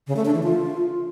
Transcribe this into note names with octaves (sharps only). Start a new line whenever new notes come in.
C#3
A3
D4
E3
F4